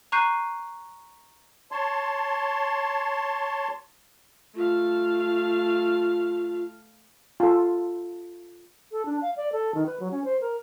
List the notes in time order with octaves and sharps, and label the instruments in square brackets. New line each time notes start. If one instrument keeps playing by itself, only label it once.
[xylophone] A#5 C#6 F#6 G6 C7 D#7
[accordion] C#5 A5 C6
[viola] A3 F5 [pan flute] F4
[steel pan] F4 A4
[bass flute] A4
D4
F5
D5
A4
D#3
B4
F#3
C#4
C5
A#4